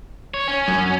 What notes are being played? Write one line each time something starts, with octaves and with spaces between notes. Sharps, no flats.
C#5
C#4
F#2